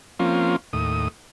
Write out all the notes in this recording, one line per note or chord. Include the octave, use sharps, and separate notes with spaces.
F3 A#3 C4 C#4 F4
D#2 A2 D#6